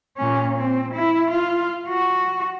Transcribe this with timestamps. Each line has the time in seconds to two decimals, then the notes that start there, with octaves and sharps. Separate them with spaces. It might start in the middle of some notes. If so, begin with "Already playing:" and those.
0.17 A#2 C#4
0.58 C4
0.94 E4
1.31 F4
1.88 F#4